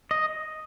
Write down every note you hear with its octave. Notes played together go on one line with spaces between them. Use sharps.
D#5